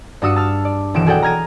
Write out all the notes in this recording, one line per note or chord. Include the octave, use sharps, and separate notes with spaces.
G2 D4 F#4 D#6 E6 C#7
A5 E6 F6
D5
D#1 B1 E3 D7 E7
F#4 G#4 A4 D5 F#5 G5
A#5 F6 G#6 A#6 D#7